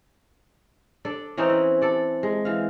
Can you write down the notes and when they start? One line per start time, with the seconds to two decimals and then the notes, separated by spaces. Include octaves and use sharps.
1.05 D4 A4 D5
1.37 E3 C4 C#4 D#4
1.49 E4
1.82 A4 D5
2.23 G#3
2.45 E3 F5